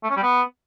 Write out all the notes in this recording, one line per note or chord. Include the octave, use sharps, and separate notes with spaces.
A3
C#4
G3
B3